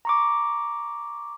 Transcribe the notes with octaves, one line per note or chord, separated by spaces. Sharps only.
A#5 C#6 D6